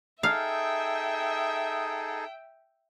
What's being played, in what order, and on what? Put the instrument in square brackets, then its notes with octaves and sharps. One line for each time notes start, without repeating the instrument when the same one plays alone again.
[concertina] D#4 G#4 A4 [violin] E5 G5 [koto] F5